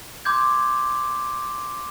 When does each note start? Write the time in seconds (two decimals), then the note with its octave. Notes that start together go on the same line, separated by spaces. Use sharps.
0.25 C6 D6 G6 G#6